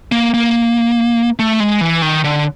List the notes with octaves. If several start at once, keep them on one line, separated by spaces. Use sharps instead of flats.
A#3
A#3
A3
G#3
E3
D#3
D3